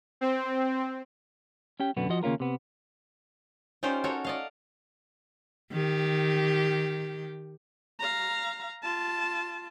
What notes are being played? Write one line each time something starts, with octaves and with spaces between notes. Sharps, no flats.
C4
C#4 G4 G5
F#2 B2 D3 B3
F3 F#4 D#5
D#2 C#3 A#3 C#4 F4 A#4
C3 B3
C#4 D#4 F4 G4 C5 D5
F#4 A4 A#4 C#5
D5 D#5 F5
D#3 G4
F5 A#5
F4 A5